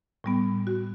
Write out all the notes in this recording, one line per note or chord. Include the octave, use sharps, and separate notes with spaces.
A2 G3 B3
F#4